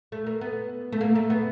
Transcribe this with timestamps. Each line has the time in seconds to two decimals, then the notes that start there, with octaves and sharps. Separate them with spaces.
0.12 A3
0.26 A#3
0.41 B3
0.92 A3
1.01 A#3
1.15 A3
1.30 B3